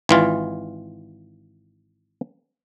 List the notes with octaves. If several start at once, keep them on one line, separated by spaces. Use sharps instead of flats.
G#1 E3 F4